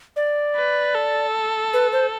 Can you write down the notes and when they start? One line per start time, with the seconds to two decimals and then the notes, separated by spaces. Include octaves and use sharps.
0.16 D5
0.56 B4
0.94 A4
1.73 B4
1.93 C5